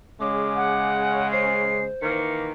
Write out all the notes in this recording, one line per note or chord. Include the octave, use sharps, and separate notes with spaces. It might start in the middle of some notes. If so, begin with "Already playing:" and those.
C#3 G#3 D6
F#5
C5 C7
D#3 E3 A#3 C#7